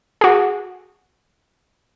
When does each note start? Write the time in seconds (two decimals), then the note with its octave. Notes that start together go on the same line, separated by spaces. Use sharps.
0.21 F#4 G#4